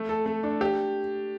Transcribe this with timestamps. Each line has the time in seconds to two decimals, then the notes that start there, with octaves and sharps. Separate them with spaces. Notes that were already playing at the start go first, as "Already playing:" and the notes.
Already playing: A3
0.09 A4
0.26 A3
0.43 D4
0.61 G4